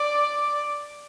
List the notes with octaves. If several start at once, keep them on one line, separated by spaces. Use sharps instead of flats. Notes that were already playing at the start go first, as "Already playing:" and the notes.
Already playing: D5